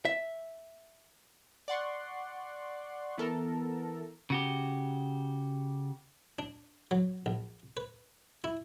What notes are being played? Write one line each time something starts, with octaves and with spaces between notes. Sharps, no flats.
E5
D5 F#5 C6 C#6
E3 B3 A4 A#4
C#3 F#4 G4
D4
F#3
A#1
B4
E4